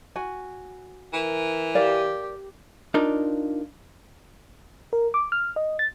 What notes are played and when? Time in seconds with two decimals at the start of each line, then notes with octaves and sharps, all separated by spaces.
0.16 F#4 G#5
1.13 E3 A#4
1.75 G4 A#4 D5 F5
2.94 D4 D#4 F4 A#4 D5
4.93 A#4
5.14 D6
5.32 F6
5.56 D#5
5.79 A6